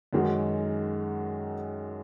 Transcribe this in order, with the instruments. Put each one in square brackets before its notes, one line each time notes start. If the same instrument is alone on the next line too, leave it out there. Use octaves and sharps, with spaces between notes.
[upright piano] F#2 D#3 G#3 D#4 F#4